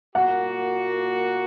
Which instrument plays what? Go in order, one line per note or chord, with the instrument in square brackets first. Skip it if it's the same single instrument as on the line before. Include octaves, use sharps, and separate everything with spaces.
[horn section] A#2 A#3 F#4 [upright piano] F#5